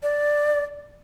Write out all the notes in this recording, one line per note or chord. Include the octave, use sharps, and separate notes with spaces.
D5